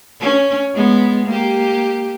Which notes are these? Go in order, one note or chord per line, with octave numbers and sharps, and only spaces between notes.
C#4
G#3 B3
A#3 G4